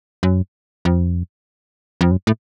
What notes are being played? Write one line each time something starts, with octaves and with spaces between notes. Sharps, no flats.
F#2
F2
F2
F#2
A2